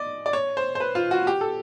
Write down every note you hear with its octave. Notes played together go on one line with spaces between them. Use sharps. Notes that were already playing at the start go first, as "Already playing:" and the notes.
Already playing: D5 D#5
D5
C#5
C5
C5
B4
F4
F#4
G4
A4